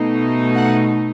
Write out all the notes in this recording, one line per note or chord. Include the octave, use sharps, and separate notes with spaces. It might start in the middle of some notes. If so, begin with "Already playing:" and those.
Already playing: B2 A3 D#4
F#5